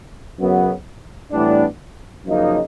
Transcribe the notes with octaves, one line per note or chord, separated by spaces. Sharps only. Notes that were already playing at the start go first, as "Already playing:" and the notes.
F#2 C#3 F#3 B3
A2 E3 G3 B3 D4
F#2 C#3 F3 A#3 D#4